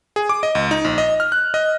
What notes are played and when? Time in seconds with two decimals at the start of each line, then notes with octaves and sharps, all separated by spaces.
0.16 G#4
0.29 D6
0.43 D#5
0.55 C#2
0.71 D#4
0.85 A#1
0.98 D#5
1.20 F6
1.32 F#6
1.54 D#5